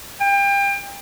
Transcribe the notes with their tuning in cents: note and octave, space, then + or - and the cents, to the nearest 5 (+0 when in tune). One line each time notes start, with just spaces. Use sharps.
G5 +30